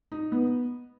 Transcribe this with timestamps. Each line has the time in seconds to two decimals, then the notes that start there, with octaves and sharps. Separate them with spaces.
0.12 D#4
0.32 B3